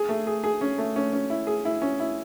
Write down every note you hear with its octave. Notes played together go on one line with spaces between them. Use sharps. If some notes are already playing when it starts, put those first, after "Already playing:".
Already playing: G#4
A3
G#4
G#4
C#4
A3
C#4
C#4
E4
G#4
E4
C#4
E4